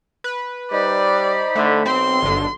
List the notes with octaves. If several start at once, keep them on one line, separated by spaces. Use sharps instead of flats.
B4
G3 D#4 C5 D5 B5
D3 A3
B1 C4 C6
G1 D3